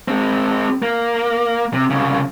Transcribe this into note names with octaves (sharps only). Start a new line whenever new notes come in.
G#3 C4
A#3
C3
C2 C#3